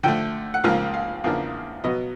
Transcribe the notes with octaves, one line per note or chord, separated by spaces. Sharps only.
D3 F3 A3 G5
F#5
C#2 C#3 F3 A#3 F5
F5
E2 C#3 F3 A#3 D4 F5
B2 F#3 B3 D#5